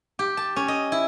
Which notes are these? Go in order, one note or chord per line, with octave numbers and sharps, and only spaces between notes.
G4
A5
C#4
D#5
E4